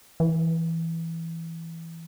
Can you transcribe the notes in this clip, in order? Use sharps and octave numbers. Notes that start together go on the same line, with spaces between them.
E3